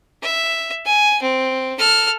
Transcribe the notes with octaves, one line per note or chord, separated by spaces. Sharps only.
E5
G#5
C4
A4 F6